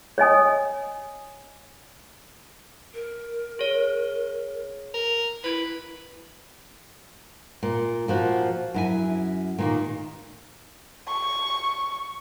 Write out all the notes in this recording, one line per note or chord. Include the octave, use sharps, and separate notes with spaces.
C#5 D#5 G#5 D#6
A#4
G#4 C#5
A#4
E4 B4
A#2
A#2 F3 F#4
F#2 E4 G#5
A#2 D#3 A#3
C#6